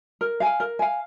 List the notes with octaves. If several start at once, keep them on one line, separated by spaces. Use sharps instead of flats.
A#4
F5 G#5
A#4
F5 G#5